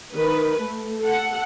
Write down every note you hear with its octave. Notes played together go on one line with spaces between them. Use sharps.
D#3 B4
A3
A4 F#5